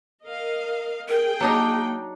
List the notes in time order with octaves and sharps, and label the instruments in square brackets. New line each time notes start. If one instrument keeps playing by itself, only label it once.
[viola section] A#4 D#5 F5
[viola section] G#4 G5 [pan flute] A#4
[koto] F#3 D4 D#4 [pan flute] A#3